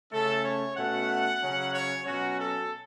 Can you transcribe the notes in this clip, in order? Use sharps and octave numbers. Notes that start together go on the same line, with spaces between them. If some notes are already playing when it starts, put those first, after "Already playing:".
C#3 A3 C#4 A4
C#5
B2 A3 C#4 F#5
C#3 F#3 C#4
C#5
B2 F#3 C#4 F#4
A4